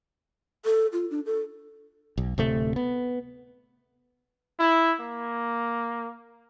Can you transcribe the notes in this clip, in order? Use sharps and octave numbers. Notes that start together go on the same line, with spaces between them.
A4
F4
D4
A4
B1
D1 C3 A3
B3
E4
A#3